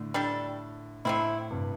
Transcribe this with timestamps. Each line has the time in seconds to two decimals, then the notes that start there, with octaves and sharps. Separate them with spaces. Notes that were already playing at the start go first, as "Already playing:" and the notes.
Already playing: A2 D3
0.14 G3 D4 A4
1.05 A2 D3 C4 E4
1.51 G2 C3